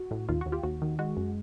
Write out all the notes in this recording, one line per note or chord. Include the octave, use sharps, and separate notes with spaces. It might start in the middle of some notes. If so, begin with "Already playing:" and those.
Already playing: F#4
A2
D#2 F4
D#2 F#4
F4 G4
D#2 F#4
D#3
G#3 F#4
F#2